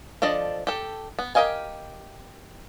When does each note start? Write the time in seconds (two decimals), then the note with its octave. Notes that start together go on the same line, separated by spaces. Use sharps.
0.22 F3 D4 A4 D5 D#5
0.67 G4 A4
1.19 B3
1.35 G4 A#4 D#5 F5 G#5